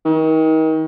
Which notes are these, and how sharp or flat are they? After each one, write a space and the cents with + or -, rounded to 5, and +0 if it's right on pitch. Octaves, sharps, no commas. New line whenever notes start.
D#3 +35